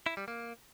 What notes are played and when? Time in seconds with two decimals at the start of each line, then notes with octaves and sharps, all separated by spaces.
0.06 E4
0.17 G3
0.28 A#3